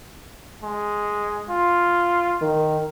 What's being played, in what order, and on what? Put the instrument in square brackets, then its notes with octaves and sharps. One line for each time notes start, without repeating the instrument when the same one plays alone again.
[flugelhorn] G#3
F4
[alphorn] D#3